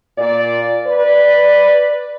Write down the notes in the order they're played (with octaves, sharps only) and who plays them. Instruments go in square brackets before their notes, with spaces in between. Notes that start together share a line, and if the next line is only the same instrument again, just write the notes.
[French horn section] A#2 D5
B4 D5